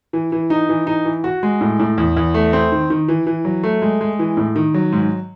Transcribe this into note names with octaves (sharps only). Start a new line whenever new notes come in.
E3
E3
D#4
E3
D#4
E3
F#4
G#3
A2
A2
E2
E2
A3
C4
D#3
D#3
E3
E3
F#3
A3
G#3
G#3
E3
A2
D#3
F#3
G#2